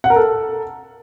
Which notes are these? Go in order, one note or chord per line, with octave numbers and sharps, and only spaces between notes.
F#5
A#4
A4